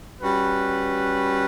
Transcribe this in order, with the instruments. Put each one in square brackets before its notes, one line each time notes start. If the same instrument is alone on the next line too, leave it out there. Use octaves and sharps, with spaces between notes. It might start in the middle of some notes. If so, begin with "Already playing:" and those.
[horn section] G3 C#4 F#4 B4